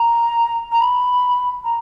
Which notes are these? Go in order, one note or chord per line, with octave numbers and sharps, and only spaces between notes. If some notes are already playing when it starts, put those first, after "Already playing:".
Already playing: A#5
A#5
B5
A#5